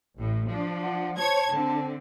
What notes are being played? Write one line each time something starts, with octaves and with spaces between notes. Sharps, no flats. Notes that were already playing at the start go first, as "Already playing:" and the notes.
A1 A2
F3 D4
F#5
C5 C#5 A5 G#6
D3 C4